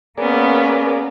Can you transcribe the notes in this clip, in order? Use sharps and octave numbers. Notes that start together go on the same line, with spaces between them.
A#3 B3 C#4 G#4 A#4 D5